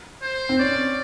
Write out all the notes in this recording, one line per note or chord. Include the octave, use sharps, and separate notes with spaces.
C5
C4
C#4 D5